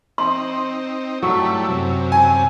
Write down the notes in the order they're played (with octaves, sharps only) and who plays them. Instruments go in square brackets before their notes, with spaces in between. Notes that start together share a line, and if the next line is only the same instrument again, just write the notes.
[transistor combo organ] C4 D#4 [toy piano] C6
[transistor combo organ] G2 A3 E4 [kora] F#3
[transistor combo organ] F#2 C3
[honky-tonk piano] G#5